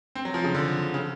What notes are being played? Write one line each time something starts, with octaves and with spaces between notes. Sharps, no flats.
C4
F#3
F3
C#3
D3
C#3